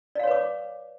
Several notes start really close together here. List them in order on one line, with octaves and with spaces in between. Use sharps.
D5 F5 C#5 B4 D6